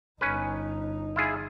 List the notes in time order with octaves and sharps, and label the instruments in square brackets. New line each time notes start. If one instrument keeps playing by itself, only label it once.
[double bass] G1 D#4 [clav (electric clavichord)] C#4 B4
[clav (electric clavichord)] E4 F4 G#4